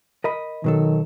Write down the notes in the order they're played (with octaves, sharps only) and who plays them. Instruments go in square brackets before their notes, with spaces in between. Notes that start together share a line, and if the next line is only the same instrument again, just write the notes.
[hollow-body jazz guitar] A#4 D#5 B5
[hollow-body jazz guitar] B2 F#3 A4 [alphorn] D#3